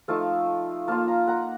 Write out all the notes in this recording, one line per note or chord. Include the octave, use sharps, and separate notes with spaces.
F3 A3 D#4 F5 A5
A#3 F4 F5 A5
A#5
F#5 A#5